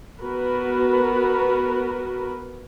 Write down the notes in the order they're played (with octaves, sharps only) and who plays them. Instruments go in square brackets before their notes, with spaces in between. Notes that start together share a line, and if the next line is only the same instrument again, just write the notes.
[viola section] B3 F#4 A#4 B4